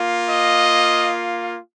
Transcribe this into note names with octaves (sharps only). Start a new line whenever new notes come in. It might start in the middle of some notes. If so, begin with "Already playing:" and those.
Already playing: A#3 F4
D#5